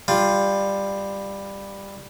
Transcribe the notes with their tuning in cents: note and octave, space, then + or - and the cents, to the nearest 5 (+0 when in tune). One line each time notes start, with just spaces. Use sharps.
G3 +10 F4 -5